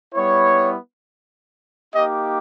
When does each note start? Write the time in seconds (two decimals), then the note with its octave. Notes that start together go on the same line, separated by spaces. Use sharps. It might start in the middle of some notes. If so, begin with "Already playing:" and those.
0.14 G3 B3 E4 C#5
1.95 A#3 D#4 G4 D#5